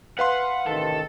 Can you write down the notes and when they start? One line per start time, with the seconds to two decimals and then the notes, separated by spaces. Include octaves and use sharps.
0.19 B4 F5 F#5 C6
0.67 A1 C3 D#3 A4